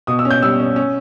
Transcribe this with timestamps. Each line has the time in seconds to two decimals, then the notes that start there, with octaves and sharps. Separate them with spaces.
0.07 B2 D#6
0.19 E6
0.25 C#4
0.31 G6
0.42 G3 E6
0.60 C#4
0.76 C#4